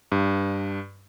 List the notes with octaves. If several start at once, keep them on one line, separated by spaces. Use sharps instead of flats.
G2